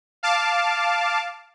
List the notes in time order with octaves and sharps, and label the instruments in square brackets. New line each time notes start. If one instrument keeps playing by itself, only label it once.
[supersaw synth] F5 A5 D6